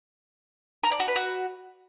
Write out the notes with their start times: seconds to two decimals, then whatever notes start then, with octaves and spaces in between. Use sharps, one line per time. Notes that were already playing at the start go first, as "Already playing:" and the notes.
0.83 A#4
0.91 D5
1.00 F#4
1.08 B4
1.16 F#4